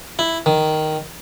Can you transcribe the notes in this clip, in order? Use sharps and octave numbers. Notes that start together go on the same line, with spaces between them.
E4
D#3